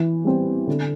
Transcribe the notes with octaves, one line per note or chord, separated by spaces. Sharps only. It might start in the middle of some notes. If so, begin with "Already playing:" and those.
Already playing: E3
G3 C4
D3